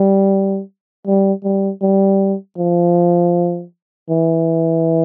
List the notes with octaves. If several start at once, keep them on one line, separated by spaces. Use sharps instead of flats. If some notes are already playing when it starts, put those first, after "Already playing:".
Already playing: G3
G3
G3
G3
F3
E3